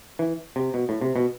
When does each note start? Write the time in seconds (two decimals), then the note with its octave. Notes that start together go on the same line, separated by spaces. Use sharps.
0.19 E3
0.56 C3
0.74 B2
0.89 A2
1.01 C3
1.16 B2